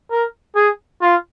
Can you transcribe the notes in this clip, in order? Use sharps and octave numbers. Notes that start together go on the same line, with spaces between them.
A#4
G#4
F4